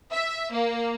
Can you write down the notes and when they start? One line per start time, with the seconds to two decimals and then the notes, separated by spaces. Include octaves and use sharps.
0.12 E5
0.51 A#3